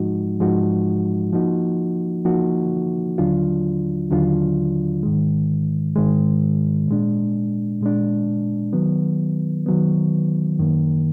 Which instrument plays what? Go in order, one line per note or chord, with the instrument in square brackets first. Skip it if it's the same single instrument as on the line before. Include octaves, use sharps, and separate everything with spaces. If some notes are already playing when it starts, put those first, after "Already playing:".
Already playing: [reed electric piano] G#2 F3 G#3 D#4 F#4
G#2 F3 G#3 D#4 F#4
F3 A#3 D#4 F#4
F3 A#3 D#4 F#4
D#2 D3 F#3 D4 F4
D#2 D3 F#3 D4 F4
G#2 D#3 G#3
G#2 D#3 G#3
A#2 G#3 D4
A#2 G#3 D4
D#3 F#3 B3
D#3 F#3 B3
F#2 D#3 A#3